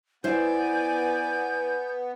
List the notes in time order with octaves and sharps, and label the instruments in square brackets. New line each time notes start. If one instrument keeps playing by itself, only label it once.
[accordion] B3 [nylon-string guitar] E4 C5 [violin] D5 G#5 [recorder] G6